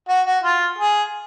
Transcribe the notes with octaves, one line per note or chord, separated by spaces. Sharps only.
F#4
F#4
F4
G#4